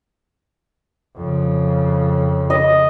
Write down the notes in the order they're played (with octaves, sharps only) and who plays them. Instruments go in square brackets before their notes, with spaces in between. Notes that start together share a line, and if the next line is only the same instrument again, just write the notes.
[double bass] F2 C#3
[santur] D#5